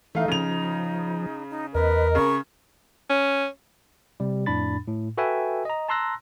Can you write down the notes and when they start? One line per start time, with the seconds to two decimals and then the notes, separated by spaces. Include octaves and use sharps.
0.15 E3 A3 D#4 E5 F5
0.28 C#3 F3 F7
1.50 D#4
1.75 E2 A#4 B4 D#5
2.15 C#3 C#6
3.10 C#4
4.20 C3 G3
4.46 F2 A2 D4 B5 A6
4.88 A2
5.18 F#4 A4 B4 E5 G5 G#5
5.65 D#5 A#5
5.89 A5 A#5 C6 E6 F#6 A#6